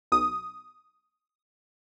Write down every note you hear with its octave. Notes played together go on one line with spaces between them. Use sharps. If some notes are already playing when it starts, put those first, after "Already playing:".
B1 D#6